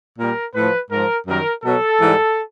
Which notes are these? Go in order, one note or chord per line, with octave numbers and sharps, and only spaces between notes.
A#2 G3 A#4
A2 F3 B4
G#2 F3 A#4
F#2 D#3 G3 A#4
B2 F#3 A4
G#2 E3 G3